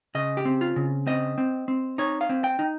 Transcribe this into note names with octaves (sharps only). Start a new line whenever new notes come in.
C#3 D#5
G4
C4
F4
C#3
C4 D#5
C4
C4
D#4 C#5
F5
C4
G5
D#4